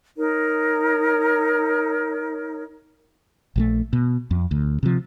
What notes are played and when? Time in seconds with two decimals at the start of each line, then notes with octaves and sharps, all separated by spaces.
0.17 D#4 A#4 C#5
3.56 A#1 F3 A3
3.93 B2
4.31 F2
4.51 D2
4.83 C3 F3